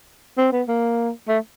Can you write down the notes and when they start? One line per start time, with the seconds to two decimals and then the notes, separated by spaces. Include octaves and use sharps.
0.38 C4
0.52 B3
0.68 A#3
1.28 A3